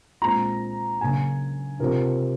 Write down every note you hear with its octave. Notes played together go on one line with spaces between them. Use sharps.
A#2 G#3 C4 A#5
C#3 F#3 A#3 G#5
C3 F3 C4 A#4